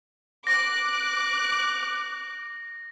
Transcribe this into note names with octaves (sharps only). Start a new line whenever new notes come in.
D6 F#6 A#6